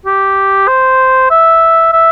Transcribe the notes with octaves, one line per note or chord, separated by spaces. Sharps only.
G4
C5
E5
E5